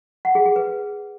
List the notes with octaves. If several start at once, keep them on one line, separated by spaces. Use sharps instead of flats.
F#5
G#4
G#4
B4